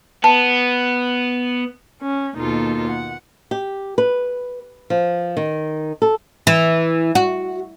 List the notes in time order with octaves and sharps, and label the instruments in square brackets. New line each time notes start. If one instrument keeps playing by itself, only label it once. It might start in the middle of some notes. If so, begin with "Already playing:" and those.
[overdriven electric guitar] B3 [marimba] A5
[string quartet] C#4
D#2 B2 A#3 D#4 F4 A4
F#5
[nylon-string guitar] G4
B4
F3
D#3
A4
[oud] E3
F#4